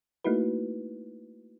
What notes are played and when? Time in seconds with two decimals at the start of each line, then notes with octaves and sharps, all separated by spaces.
0.24 A3 A#3 D#4 E4 F#4 B4